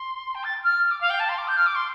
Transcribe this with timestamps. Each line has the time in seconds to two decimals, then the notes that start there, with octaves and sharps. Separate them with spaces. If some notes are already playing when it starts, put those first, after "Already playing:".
Already playing: C6
0.35 G5
0.44 A6
0.63 F6
0.91 D6
1.01 F5
1.10 G5
1.20 A5
1.29 C6
1.38 D6
1.48 G6
1.57 F6
1.66 D6
1.75 C6